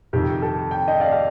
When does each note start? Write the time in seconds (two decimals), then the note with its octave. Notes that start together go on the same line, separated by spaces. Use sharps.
0.13 F2 C3 D#3 G4
0.42 A4
0.71 G5
0.88 D#5 G5
1.00 D5 F5
1.12 F5